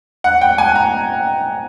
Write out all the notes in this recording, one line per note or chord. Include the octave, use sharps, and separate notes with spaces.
F#5
G5
G#5
A#5